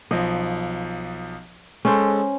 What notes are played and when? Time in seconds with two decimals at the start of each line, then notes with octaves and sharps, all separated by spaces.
0.11 B1 F3 D#5
1.85 G#3 C#4 A4 C5